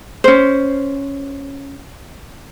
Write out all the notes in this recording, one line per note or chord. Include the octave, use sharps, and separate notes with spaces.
C#4 C5